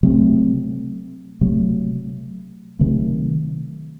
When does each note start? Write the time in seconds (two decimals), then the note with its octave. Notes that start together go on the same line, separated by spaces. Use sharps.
0.03 C3 F#3 A3 C4
1.41 C3 F#3 A3
2.79 C3 D#3 F#3 A3